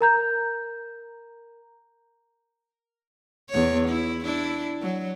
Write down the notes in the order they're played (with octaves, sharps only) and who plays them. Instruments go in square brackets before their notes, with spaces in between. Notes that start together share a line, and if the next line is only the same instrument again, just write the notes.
[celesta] A#4 A#5 G6
[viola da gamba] E2 C#5
E4
D4 E4
F#3